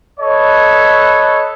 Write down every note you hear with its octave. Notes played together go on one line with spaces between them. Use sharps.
A4 B4 C#5 D#5